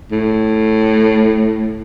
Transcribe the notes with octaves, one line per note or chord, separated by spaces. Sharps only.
A2